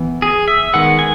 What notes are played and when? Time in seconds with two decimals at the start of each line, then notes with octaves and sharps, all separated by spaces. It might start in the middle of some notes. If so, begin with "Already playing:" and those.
Already playing: E3 B3
0.22 G#4
0.48 E5
0.73 D#3 G#3 B3 F#5
0.99 G#5